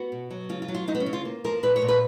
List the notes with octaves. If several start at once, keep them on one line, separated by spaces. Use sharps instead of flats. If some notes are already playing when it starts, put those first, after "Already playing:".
Already playing: B3 F#4
B2
F#3
C#3 F4
F4
F#3
F4
F#3 D#4
B3
C#4
C#3
F4
A#3
F3 A#4
A#2 B4
C#5
A#2
B4